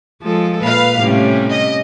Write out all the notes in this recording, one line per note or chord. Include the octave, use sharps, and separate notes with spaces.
F3 G#3 A4
A#2 B4 F5
A2 C3 G3 C#4
D#5